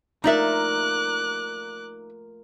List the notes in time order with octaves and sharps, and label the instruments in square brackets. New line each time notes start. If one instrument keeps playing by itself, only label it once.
[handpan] A3 F4 A#4 [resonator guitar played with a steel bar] D#4 D5 E5 [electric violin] D6 F#6